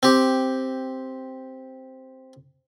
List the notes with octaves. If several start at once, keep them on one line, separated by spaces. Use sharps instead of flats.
C4 G4